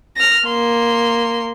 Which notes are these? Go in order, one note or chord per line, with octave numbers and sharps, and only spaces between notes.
F6 A#6
A#3 C6